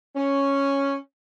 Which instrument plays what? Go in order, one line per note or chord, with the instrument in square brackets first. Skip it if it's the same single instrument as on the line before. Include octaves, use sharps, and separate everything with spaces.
[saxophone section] C#4